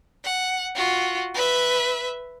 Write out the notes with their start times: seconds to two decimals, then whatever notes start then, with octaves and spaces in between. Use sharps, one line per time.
0.24 F#5
0.75 F4 F#4
1.34 B4 E5